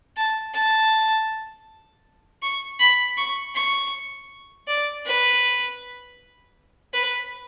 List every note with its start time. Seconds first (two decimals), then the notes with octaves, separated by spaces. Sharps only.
0.17 A5
0.54 A5
2.42 C#6
2.80 B5
3.17 C#6
3.55 C#6
4.68 D5
5.05 B4
6.93 B4